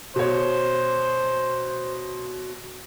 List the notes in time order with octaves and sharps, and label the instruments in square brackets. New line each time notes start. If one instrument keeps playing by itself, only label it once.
[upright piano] B2 C#5 [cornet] C5